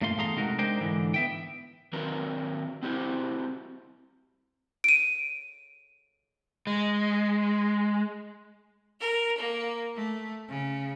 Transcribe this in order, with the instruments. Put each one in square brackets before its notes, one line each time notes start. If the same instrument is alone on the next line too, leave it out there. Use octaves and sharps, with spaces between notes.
[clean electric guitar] G2 A#2 A3 F5 C6
E2 A3 G#4 F5 A#5 C6
C3 G#3 A3 D#4 F#4 A#4
G#3 D4 D#4 A#4 C5 G5
G#2 D3 E3
B3 E5 G5
[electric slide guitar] D#3 F#3 C4 A#4 B4
C4 E4 F#4 G4 C5
[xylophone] D7 D#7
[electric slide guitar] G#3
[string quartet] A#4
A#3
A3
C#3